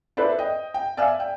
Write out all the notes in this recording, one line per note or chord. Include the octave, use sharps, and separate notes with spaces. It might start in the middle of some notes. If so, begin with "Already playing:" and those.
E4 A4 B4 C5 D5
D#5 G5
G5
D5 E5 F5 G#5 E6
G5